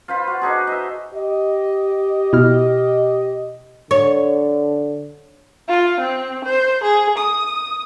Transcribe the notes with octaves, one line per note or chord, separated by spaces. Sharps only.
F4 C5 B5
F#4
D4 D#4 G#4
D#5 E5
G4 D#5
B2 E4 F6
D3 C#5
F4
C4
C5
G#4
D#6